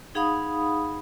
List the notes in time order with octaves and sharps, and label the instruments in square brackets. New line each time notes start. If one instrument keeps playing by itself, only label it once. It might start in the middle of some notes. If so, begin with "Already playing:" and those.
[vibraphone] D#4 G#4 F5 F#5 B5 D#6